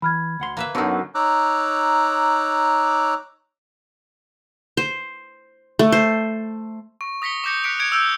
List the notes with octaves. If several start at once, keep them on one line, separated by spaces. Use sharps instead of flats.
E3 B5 F6 G#6
D2 F#5 C6
A#3 B4 E5
F#2 D3 F#3 B3 D#4 A4
D#4 C#5 A#5 D6 E6 F#6
C5
A3
C5
C#6
D#6 A#6 B6 C#7 G7
D6 D#6 G6 A#6 C#7
D#6 F#6 B6 C#7 D7 F7
G#6 C#7 D7 F7
E6 F6 G6 D7